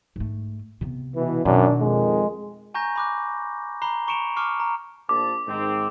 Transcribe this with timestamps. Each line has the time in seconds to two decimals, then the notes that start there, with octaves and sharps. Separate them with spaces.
0.16 G#2 A3
0.81 C3 B3
1.15 B2 E3
1.45 F#2 B2 D#3 D4
1.81 F2 D#3 G#3
2.74 G#5 A#5 C#6 G6 A#6
2.96 B5 D6 F#6
3.82 A#5 B5 F#6 C7 G7
4.07 A#5 C#6 C#7 D7 E7 F7
4.36 A5 C#6 D6 F6 C7
4.60 A#5
5.09 A#1 A5 D6
5.47 G#2 D#3 C4